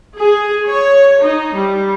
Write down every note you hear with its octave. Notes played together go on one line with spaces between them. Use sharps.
G#4
C#5
D#4
G3